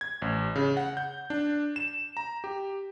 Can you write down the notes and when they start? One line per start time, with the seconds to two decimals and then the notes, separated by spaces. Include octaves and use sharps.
0.01 G#6
0.22 A1
0.55 C#3
0.77 F#5
0.97 G6
1.30 D4
1.76 E7
2.17 A#5
2.44 G4